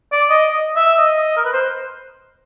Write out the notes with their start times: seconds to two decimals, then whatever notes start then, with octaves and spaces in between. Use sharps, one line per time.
0.12 D5
0.29 D#5
0.51 D#5
0.76 E5
0.98 D#5
1.36 A#4
1.45 B4
1.53 C5